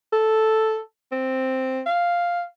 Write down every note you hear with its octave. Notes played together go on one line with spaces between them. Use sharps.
A4
C4
F5